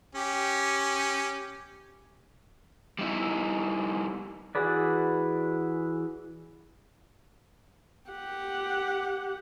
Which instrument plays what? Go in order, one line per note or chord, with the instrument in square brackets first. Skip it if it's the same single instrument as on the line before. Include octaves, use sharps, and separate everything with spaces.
[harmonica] C#4 G4
[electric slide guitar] G3 D#4 E4
[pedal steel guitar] E3 F#4 G#4 B4 D5
[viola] G4 F#5